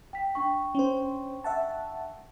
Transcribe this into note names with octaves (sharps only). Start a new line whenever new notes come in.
G5 B6
D4 G5 C#6
C#4 C5
E5 F#5 A5